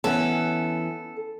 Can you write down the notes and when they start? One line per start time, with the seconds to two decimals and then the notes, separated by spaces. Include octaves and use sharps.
0.04 E3 B3 C#4 A4